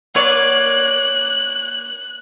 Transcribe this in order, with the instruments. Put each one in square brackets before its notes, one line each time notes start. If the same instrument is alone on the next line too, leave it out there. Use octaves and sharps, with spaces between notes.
[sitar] A#3 C#5 D5 [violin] F#6